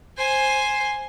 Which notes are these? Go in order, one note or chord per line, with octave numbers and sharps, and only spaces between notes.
C5 G#5